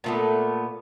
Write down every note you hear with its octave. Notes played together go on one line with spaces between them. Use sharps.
A#2 A3 B3